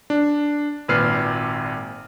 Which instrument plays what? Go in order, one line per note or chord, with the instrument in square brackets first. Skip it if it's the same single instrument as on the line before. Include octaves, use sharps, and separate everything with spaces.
[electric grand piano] D4
G#1 A#2 B4 F6 C7